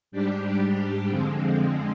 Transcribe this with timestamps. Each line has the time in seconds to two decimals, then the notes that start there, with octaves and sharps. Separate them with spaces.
0.12 G#2 G3 D4 G4
1.09 F2 D3 F3 G#3 C4